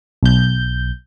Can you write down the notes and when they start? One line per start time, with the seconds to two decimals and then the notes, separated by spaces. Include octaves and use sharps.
0.23 B1 G6